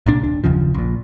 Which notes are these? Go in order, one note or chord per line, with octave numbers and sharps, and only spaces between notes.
C2 A#2 D4
D#1 D4
F#1 D#2 C#3 F3
A#1 A#2